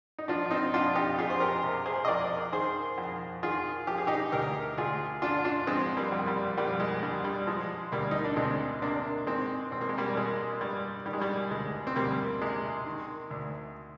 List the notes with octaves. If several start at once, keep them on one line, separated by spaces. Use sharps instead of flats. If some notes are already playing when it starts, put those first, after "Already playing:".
D#4
F3 D4 F4
C4 D#4
F2 D4 F4
D#4 G4
F2 F4 G#4
C5
G4 A#4
C3
G#4 C5
D#5
F2 A#4 D5
D#3 G#4 C5
F2
D#3 F4 G#4
F3 G4
G#4
D#4 G4
D2 G4 A#4
D2 F4 G#4
D3 D4 F4
D4 F4
F3 G#3 C4
G3 A#3
F2
G3
F2 G3 A#3
G#3
D3 G3
G3
F3 G#3
D2 G3 A#3
D#4
D4
D2 G#3 C4
C3 A#3 D4
D#3 G#3 C4
G#1 C4
A#3
G#3
G3 A#3
G#1 G#3
G2 G3
D#3 G3
G#3
G3
D2 G#3
C4
D2 G3 A#3
C3 G#3
D#3
D2